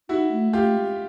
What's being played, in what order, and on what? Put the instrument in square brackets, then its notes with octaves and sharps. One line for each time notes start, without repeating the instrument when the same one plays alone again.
[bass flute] D#4 [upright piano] E4 F#4
[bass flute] A3
[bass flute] A3 [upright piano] F4 G4
[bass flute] G#3